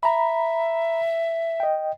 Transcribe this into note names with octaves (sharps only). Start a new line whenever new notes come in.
E5 A#5 B5
D#5 G5